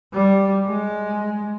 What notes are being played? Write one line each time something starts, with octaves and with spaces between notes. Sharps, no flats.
G3
G#3